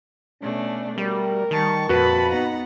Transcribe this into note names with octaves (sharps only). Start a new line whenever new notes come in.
B2 A3 C#4 D4
G3 A3 F#4 A#4
D#3 G3 A5 C#6
F2 A#2 F#4 B4 A5 B5
B3 D#4 F#5 A#5